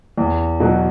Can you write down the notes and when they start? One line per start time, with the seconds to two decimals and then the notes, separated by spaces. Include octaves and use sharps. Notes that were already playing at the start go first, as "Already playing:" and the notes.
0.18 E2
0.60 B2 F#3